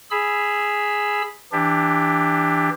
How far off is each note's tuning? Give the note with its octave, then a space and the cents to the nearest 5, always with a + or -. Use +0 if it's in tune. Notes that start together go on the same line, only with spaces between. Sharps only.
G#4 +0 B5 +0 E6 +15
E3 +0 D4 +0 G4 +20